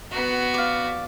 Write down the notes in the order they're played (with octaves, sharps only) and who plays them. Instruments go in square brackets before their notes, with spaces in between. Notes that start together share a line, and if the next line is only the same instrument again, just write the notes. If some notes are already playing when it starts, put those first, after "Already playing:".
[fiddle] B3 F#4
[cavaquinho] D5 F5